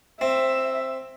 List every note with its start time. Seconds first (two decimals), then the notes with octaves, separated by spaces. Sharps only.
0.21 C4 E5